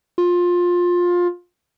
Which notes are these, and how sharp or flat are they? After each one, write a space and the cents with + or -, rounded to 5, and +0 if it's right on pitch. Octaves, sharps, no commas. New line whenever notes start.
F4 +15